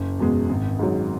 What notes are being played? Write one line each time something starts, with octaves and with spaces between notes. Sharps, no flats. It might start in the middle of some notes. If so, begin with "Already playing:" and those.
Already playing: F#1
E2 B2 G#3
G#1
G#2 F#3